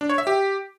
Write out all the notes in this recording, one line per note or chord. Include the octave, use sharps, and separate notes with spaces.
D4
C#5
E5
G4